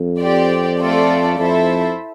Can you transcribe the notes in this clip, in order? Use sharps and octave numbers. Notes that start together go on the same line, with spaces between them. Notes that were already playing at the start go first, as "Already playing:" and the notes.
Already playing: F2
C4 G4 D5
A3 C4 F4 A4 D5
F2 E4 A4 C5 E5